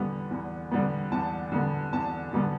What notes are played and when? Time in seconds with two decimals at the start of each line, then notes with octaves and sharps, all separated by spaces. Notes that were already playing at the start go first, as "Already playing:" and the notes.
Already playing: E2 D3 G3 B3
0.31 E2
0.71 D3 G3 B3
1.11 E2 A5
1.52 D3 G3 B3
1.93 E2 A5
2.33 D3 G3 B3